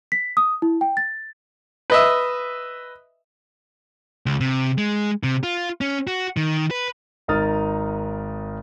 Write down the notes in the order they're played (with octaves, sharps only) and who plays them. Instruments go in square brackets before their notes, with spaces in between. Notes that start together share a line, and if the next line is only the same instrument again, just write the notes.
[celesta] B6
D#6
E4
G5
A6
[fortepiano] B4 D#5 E5
[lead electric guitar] C#2
C3
G#3
C3
F4
C#4
F#4
D#3
B4
[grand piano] G#1 D#4 A#4 D#6 F6 A6